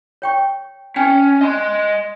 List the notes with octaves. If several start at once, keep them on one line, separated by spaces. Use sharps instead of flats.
C#5 G5 C#6
C#4 G5
D#5 C6